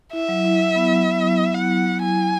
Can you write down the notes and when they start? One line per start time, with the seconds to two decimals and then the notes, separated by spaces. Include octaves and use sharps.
0.13 E4 E5
0.29 F#3
0.45 E4
0.60 E4
0.76 B3
0.92 F#3
1.07 F#3
1.24 F#3
1.39 B3
1.54 E4 F#5
1.71 F#3
1.86 F#3
2.02 E4 G#5
2.18 F#3